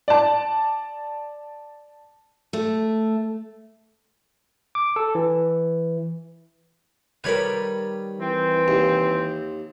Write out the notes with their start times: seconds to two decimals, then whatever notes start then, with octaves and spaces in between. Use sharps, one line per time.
0.08 D5 A5
2.53 A3
4.75 D6
4.96 A4
5.15 E3
7.24 D#3 G3 A#4 B4 C#5 B5
8.21 E3 C4
8.68 D#2